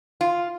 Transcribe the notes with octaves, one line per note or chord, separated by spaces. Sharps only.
F4